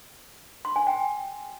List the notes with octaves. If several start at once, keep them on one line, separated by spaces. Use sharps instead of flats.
C6
G#5
G5